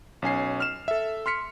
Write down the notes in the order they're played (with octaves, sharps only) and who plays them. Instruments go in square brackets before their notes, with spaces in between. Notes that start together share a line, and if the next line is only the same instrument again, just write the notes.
[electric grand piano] B1 C#4 G#5 C7
F6 E7
A4 E5
C6 F6 B6 C#7